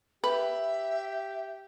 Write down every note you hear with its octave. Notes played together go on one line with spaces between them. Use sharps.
G4 B4 E5